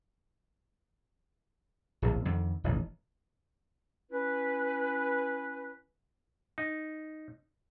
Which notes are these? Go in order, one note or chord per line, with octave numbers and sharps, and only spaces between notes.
D1 A#1 D#2
F2 D3 D#3
E1 A1 D#3
C#4 E4 B4
D#4